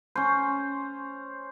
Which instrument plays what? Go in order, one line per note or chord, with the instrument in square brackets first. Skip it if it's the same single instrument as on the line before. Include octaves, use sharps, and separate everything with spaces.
[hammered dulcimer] C#4 C5